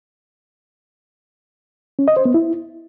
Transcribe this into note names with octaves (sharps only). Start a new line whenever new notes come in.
C#4
D#5
C5
B3
E4